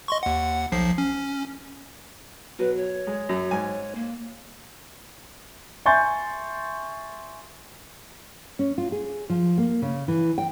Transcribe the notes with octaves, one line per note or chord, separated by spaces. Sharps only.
D#5 C6 C#6
D#2 F#5
B1 F3 C7
C#4
B2 F#3 B4
C#5
G#3
F#2
G#2 G#5
A#3
E5 G#5 C6 C#6 G6 A6
C#4
F4
G#4
F3
A#3
C#3
E3
G5